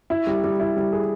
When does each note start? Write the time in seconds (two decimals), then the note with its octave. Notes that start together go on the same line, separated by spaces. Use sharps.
0.10 E4
0.27 G3
0.44 G3
0.60 E4
0.76 G3
0.93 G#4